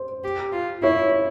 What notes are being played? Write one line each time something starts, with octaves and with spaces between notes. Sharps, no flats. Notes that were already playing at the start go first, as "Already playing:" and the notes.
Already playing: C5
G4
F4
E4 C#5